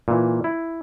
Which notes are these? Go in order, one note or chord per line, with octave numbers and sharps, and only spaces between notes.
A#2 E3
E4